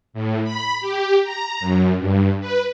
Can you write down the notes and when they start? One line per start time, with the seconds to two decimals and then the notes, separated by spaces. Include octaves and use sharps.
0.14 A2
0.44 B5
0.81 G4
1.23 A#5
1.60 F#2
1.98 G2
2.40 B4